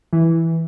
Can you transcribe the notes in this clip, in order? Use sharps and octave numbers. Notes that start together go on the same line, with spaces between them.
E3